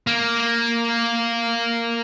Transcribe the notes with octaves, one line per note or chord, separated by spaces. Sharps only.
A#3